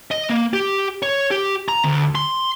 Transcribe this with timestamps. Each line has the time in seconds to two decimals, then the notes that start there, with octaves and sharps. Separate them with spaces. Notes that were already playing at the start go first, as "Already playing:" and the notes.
0.11 D#5
0.30 A#3
0.53 G4
1.02 C#5
1.31 G4
1.68 A#5
1.84 D2
2.15 C6